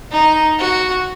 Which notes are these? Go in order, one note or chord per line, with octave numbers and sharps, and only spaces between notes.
D#4
F#4